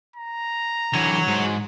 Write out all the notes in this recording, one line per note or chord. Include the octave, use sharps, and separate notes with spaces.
A#5
D3 E3 F#4 C#5
G#2